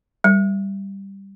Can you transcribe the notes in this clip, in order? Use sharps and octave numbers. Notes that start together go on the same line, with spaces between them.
G3